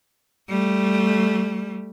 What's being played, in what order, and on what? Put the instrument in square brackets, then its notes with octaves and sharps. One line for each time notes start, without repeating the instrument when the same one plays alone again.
[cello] G3 A3